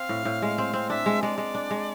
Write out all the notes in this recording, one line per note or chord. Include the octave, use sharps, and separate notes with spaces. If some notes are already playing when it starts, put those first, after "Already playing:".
Already playing: C4 F5
A2
A2
G#3
C4
C4
D4 E5
G#3
G#3 D5
G#3
D4
G#3